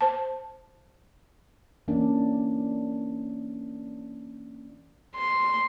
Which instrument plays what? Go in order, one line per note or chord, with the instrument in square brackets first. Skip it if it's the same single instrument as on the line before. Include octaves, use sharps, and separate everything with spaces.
[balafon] C5 A5
[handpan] E3 A#3 C#4 D4
[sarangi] C6